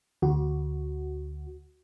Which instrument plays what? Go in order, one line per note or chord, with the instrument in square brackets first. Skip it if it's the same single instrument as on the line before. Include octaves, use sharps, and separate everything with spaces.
[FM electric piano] D2 F#4